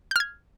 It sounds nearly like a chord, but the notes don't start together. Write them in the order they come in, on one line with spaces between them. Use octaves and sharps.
G6 F6 G#6